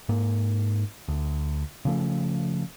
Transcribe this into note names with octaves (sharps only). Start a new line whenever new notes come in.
G#2 A#3
D2
C#3 F3 A3